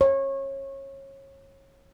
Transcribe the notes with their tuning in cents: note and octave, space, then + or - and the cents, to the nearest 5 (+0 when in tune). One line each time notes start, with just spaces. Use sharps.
C#5 -25